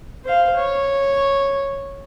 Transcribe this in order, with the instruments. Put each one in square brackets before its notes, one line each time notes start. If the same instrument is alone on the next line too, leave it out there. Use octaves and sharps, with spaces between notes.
[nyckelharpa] C5 F5
C#5